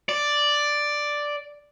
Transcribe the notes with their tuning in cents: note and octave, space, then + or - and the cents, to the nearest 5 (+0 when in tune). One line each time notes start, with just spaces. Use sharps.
D5 +0